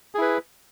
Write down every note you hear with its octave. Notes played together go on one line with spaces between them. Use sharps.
E4 G#4 B4